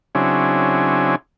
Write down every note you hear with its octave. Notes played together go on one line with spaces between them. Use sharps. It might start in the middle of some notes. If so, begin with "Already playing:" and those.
C#3 F#3 C4 D4 E4 G#4